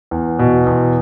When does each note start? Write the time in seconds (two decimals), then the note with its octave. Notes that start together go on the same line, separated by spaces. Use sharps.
0.11 E2
0.39 B2
0.66 E2